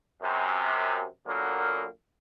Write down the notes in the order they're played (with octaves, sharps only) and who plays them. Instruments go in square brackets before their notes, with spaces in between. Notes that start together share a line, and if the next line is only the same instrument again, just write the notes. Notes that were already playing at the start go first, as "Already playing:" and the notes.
[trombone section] F#2 C3
A#2 D3 F#3 A#3 B3 A#4